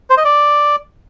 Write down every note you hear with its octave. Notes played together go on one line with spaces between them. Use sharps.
C5
D#5
D5